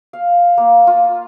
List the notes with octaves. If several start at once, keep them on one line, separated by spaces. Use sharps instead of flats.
F5
A#3
F4